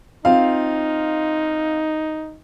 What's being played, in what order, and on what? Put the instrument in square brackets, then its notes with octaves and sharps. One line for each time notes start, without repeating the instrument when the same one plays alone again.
[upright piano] C4 F4 F5 [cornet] D#4